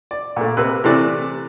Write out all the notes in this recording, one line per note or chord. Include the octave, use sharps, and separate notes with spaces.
D5
A#2 A3
C3 A#4 B4 E6 F#6
C3 E3 A3 D5 F#6